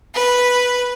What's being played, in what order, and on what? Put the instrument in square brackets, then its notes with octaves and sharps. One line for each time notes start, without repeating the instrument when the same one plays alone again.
[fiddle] B4